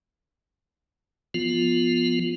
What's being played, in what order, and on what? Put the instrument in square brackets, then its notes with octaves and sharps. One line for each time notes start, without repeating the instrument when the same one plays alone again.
[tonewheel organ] F3 B3 F4